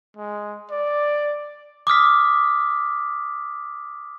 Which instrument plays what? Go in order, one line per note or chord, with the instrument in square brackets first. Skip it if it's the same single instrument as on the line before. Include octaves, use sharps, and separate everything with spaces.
[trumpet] G#3
D5
[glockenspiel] D6 D#6 F6 B6